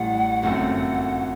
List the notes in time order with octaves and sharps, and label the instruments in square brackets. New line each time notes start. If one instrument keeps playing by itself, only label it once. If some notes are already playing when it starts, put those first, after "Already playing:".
Already playing: [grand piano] A1 A2 G3 [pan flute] F#5
[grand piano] G1 F#2 F#3 A3 C4 [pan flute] F#5